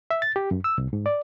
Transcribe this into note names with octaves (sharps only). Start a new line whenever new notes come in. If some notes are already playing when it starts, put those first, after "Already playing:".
E5
A6
G4
F#2
E6
C2
G#2
D5